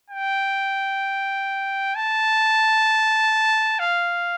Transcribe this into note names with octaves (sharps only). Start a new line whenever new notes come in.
G5
A5
F5